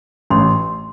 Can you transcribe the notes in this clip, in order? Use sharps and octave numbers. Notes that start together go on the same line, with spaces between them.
A1 C6